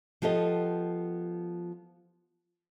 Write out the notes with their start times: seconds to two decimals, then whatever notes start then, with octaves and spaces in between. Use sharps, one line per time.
0.22 F3 B3 G4 A4 D#5